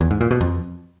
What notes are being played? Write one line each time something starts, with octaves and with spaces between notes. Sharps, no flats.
E2
G#2
A#2
B2
F2